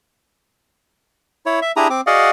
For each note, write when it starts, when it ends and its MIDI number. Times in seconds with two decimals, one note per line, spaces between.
1.46 1.60 64
1.46 1.60 73
1.62 1.72 76
1.76 1.88 62
1.76 1.88 64
1.76 1.88 67
1.76 1.88 68
1.76 1.88 82
1.76 1.88 87
1.90 2.01 60
1.90 2.01 86
2.07 2.31 66
2.07 2.31 68
2.07 2.31 74
2.07 2.31 75
2.07 2.31 77
2.07 2.31 78